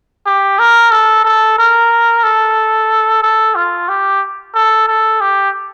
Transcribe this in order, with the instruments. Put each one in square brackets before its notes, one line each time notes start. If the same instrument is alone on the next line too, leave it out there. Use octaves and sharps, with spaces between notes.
[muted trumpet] G4
A#4
A4
A4
A#4
A4
A4
F4
G4
A4
A4
G4